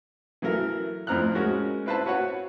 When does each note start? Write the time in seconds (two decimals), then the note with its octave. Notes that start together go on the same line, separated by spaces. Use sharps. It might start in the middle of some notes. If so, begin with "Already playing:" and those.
0.42 E3 F#3 A4 A#4 E5
1.07 F2 A2 C4 A#5 F6 F#6
1.35 G#3 C#4 F#4 A#4
1.86 C4 E4 B4 C5 E5 A5
2.06 F#4 B4 C#5 F#5